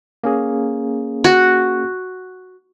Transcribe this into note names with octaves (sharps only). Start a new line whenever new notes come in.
A#3 C#4 G#4
F#4